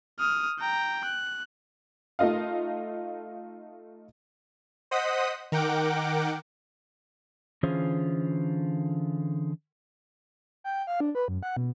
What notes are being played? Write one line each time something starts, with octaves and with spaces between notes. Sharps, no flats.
D#6 F6
G5 A#5
F#6
A3 D#4 F4 D#5 F5
C5 D#5 F#5 D#6 B6
D#3 A#4 F#5 G5 D6
D3 E3 C#4 F4 G#4 C5
G5
F5
D4
B4
F#2
F#5
B2